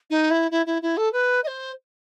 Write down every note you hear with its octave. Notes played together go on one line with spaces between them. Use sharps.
D#4
E4
E4
E4
E4
A4
B4
D#5
C5